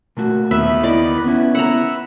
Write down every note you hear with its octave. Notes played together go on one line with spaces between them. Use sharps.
A#2 A3 F#4
D#2 B3 B4 E5
E4 D5 D#5
B3 C#4 E4
B4 E5 F#5 A#5